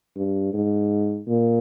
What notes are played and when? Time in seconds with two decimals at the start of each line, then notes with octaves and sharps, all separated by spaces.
0.16 G2
0.53 G#2
1.28 A#2